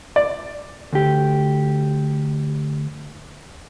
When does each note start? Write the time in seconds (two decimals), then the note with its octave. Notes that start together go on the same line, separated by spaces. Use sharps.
0.16 D5
0.93 D2 G4